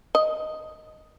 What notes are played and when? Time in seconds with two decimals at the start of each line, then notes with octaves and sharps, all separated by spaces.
0.15 D#5